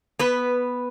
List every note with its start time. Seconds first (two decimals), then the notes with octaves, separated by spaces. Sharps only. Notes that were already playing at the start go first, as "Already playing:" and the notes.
0.19 B3 B4